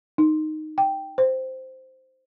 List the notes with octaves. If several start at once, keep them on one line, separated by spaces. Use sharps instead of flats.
D#4
G5
C5